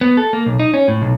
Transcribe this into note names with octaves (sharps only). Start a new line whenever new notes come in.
B3
A4
A#3
B1
D#4
C#4
A2
B1